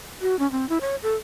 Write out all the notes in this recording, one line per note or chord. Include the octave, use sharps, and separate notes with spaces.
F#4
C#4
C4
E4
C#5
A4